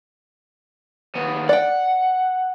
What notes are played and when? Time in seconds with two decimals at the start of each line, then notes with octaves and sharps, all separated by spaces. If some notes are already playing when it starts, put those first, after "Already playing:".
1.15 D#2 B3
1.49 D5 F#5 G5